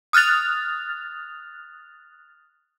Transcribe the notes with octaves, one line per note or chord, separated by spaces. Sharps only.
D#6 F6 F#6 A6 F7